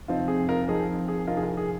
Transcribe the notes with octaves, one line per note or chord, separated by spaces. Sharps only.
C3 F3 C4 D#4 F4
G#4
F4 A#4
F3 C4 D#4 G#4
G#4
C3 F3 C4 D#4 F4 A#4
G#4
F4 A#4
G#4